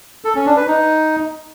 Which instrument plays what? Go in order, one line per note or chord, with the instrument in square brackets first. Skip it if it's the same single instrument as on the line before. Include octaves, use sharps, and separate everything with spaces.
[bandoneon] A4
C#4
D4
B4
D#4